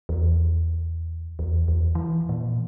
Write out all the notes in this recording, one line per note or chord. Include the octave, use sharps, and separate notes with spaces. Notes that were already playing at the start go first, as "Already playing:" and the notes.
E2
E2
E2
E3
A#2